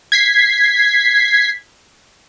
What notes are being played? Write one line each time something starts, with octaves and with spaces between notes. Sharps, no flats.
G#6 B6 C7